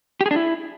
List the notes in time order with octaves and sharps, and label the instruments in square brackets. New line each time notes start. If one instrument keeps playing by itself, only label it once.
[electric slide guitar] G4
G#4
D4
E4